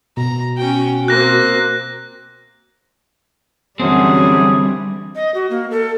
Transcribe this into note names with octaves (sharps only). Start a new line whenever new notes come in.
B2 A#5
C#4 F#4 G5
A#3 C4 F#6 A#6
F#2 D3 E3 F#3 G3 C4 G#4
D#5
F#4
A#3
A4